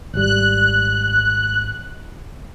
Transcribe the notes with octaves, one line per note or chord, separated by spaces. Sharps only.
G#1 G3 F#6